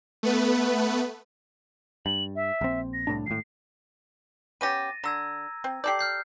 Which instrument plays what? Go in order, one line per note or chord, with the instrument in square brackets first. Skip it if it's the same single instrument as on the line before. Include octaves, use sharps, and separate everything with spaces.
[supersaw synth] A3 B3 B4
[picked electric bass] G2 [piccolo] F#7
[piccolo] E5
[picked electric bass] A#1 C4
[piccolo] A#6
[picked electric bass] C2 A2 D4
[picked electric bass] G#1 A2 [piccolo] C7
[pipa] B3 C#4 G4 [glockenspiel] A6 A#6 D#7
[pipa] D3 [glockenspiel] A#5 E6 G#6
[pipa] C4
[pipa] G4 A4 D5 [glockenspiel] G6 C7
[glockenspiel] F6 G6 C7